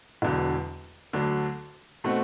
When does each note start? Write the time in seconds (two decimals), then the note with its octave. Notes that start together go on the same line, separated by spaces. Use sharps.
0.22 E1 E2 D3 F#3
1.13 D2 D3 F#3
2.04 B2 A3 C4 F#4